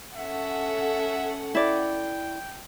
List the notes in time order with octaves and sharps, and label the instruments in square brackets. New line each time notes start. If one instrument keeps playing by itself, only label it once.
[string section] C#4 A4 F#5 [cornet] E5
[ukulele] E4 D5 [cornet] G5